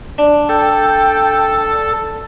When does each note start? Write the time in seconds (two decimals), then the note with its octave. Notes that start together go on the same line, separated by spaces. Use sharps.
0.18 D4
0.49 A4 G5